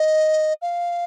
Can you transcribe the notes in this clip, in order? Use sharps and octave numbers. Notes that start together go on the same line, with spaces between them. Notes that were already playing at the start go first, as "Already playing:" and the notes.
Already playing: D#5
F5